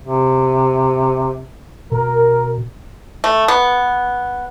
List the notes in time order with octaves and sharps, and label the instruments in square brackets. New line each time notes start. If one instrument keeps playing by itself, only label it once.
[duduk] C3
[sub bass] B2 [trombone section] A#4
[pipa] A3
B3